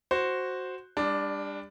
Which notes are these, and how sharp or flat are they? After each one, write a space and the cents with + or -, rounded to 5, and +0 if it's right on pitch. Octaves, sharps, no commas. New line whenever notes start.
F#4 +0 C5 +0
G3 +35 D4 +0